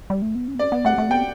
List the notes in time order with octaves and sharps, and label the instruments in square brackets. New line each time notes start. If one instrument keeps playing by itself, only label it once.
[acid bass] G3
A3
B3
C#4
B3
[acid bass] C#4 [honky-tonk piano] D5
[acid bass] B3
[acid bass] A3 [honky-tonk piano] F#5
[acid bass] A3
[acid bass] B3 [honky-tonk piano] G5